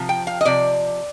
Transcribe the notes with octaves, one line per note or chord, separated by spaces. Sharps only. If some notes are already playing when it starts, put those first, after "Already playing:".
Already playing: C3 F3
G5
F5
D#5
C3 F3 D5